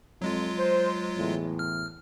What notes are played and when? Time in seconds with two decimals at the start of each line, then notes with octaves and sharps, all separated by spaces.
0.22 F2 F#3 G#3 F4
0.58 C5
1.16 E2 A2
1.59 F6